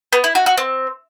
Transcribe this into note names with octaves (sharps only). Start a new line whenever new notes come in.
B3
E4
F#4
F#4
C4